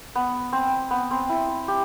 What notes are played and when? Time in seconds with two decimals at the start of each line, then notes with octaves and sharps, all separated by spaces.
0.15 B3
0.53 C4
0.91 B3
1.11 C4
1.29 E4
1.68 G4